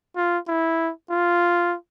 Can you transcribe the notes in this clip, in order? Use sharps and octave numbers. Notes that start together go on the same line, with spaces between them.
F4
E4
F4